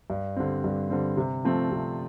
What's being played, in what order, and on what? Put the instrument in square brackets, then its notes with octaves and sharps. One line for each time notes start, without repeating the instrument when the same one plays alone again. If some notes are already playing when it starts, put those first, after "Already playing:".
[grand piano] G2
D3 G3 C4
G2
D3 G3 C4
C3
F3 A3 C4
C3